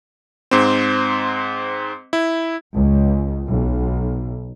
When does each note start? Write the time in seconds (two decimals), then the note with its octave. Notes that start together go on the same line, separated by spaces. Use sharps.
0.51 G#2 C4
2.13 E4
2.77 C#2
3.48 B1